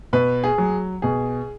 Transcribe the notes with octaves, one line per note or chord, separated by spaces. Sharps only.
B2 B4
G#4
F#3
B2 G#4